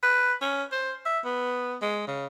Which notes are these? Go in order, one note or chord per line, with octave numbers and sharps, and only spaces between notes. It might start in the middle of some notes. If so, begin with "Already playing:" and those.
B4
C#4
C5
E5
B3
G#3
C#3